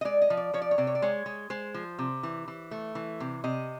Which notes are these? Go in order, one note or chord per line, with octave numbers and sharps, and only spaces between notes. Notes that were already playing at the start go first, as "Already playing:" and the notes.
D#5
G#3 D5
D#5
F3
D5
F3 C#5
D5
C#5
C3 D5
C#5
D5
G#3 C#5
G#3
G#3 C5
F3
C3
E3
E3
A3
E3
C3
C3 D#5